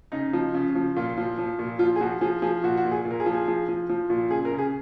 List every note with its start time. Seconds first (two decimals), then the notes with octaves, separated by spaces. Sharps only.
0.12 C#3 D#4
0.33 F3
0.54 C#3
0.75 F3
0.96 A#2 F4
1.18 F3
1.38 F3
1.59 A#2
1.79 F3 F4
1.96 G#4
2.00 F3 F#4
2.21 F3 G#4
2.42 F3 G#4
2.63 A#2 F#4
2.77 F#4
2.85 A#2
2.91 G#4
3.05 A#2
3.11 A#4
3.20 G#4
3.26 F3
3.34 G#4
3.48 F3
3.68 F3
3.89 F3
4.10 A#2
4.30 C#3 G#4
4.45 A#4
4.51 C#3
4.58 G#4